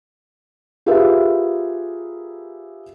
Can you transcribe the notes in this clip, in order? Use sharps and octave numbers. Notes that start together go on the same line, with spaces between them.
F4 G4 G#4 A#4 B4 E5